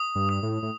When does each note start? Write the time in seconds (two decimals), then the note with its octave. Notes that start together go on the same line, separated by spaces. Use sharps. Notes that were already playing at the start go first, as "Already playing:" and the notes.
Already playing: D#6
0.15 G2
0.29 D#6
0.43 A2
0.62 A2